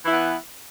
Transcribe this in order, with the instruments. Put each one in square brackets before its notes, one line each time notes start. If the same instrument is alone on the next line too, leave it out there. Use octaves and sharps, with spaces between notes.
[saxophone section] E3
E4
B3